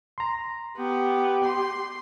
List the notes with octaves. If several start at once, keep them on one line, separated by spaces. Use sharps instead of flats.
A#5 C6
B3 G4
C6